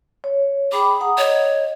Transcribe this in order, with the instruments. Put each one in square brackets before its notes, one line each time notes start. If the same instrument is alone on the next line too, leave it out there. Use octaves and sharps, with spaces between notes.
[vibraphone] C#5
[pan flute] G#4 [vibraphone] G5 B5 D6
[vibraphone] F#5 A#5 D#6
[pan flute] C#5 [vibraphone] D#5